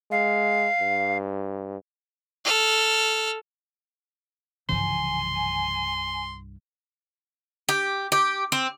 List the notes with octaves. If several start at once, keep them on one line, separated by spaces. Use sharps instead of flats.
G#3 F5
G2
A4 F6
C2 G2 C#3 E3 F3 G#5 C6
G4
G4
C4